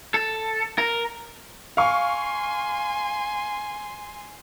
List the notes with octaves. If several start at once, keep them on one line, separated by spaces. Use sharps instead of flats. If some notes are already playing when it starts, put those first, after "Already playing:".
A4
A#4
F5 G#5 C6 C#6